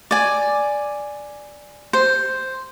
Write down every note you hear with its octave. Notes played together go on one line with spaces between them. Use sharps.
D5 G#5
C5